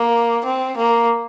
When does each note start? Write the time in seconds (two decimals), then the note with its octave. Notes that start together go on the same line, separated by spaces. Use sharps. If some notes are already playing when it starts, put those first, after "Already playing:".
Already playing: A#3
0.45 C4
0.78 A#3